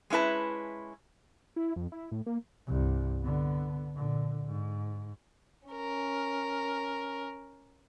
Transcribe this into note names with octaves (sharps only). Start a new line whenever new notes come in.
G#3 C#4 E4 B4 A5
E4
F2
E4
A2
A#3
C2 G2
D3 B3
A#2 D3
G#2
C#4 A#4